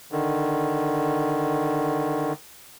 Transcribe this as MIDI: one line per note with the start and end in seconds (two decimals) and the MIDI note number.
0.12 2.33 50
0.12 2.33 51